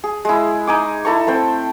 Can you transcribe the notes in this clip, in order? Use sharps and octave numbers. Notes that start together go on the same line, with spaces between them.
G#4
G#3 E4
D#4 G#5 D6
E4 A4 A#5 C#6
A3 C4 C5 G5